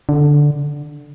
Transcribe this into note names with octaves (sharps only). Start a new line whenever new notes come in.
D3